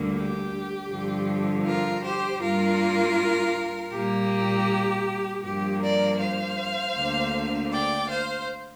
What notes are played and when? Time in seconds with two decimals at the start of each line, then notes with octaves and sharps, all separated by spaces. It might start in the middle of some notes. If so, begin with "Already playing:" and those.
Already playing: D2 D3 G3 A#3
0.14 G4
0.89 G2 D3 F3
1.64 F4 A#4
2.03 G4 C5
2.40 G2 G3 A#3 F4 A#4
3.92 A#2 G3 A#3 G4
5.44 G2 F3 A#3 G4
5.81 A#4 D5
6.20 C5 F5
6.95 D2 D3 A#3
7.71 D5 G5
8.08 C5 F5